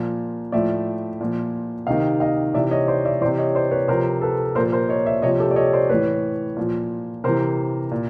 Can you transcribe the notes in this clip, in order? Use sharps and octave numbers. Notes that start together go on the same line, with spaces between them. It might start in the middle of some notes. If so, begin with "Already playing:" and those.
Already playing: A#2 F3
A2 F3 D5 E5
A#2 F3
C3 D#3 D#5 F5
D#5 F5
C3 E3 D5 E5
C#5 D#5
C5 D5
D5 E5
C3 E3 C5 D5
C#5 D#5
C5 D5
B4 C#5
C3 F3 A#4 C5
A4 B4
A#2 F3 A#4 C5
A#4 C5
C#5 D#5
D5 E5
C3 F3 C#5 D#5
G4 A4
D5
C#5 D#5
C5 D5
A2 E3 B4 C#5
A#2 F3
C3 E3 A#4 C5
A#2